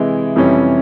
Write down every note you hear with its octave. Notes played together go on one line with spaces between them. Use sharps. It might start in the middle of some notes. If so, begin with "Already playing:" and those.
Already playing: C3 E3 G#3 E4
F2 C3 E3 G3 C#4